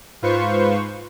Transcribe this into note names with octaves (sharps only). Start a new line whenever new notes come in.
G#2 F4 B4 C5 C#6